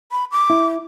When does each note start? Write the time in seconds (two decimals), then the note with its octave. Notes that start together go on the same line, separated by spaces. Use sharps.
0.11 B5
0.32 D6
0.50 E4